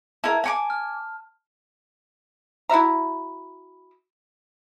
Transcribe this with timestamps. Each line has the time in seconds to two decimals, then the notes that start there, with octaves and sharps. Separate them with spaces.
0.24 E4 A#4 A5
0.44 G#5 C#6 D6
0.70 F6
2.69 E4 F#4 E5 A#5